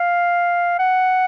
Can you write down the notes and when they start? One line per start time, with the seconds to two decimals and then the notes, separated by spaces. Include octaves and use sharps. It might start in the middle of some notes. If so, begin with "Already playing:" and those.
Already playing: F5
0.79 F#5